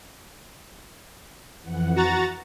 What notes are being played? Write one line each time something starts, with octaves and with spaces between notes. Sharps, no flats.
F2 E3 F#5
F#4 A#5 A6